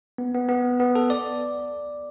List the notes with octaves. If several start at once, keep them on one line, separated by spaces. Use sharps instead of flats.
B3
B3
B3
B3
A4
D5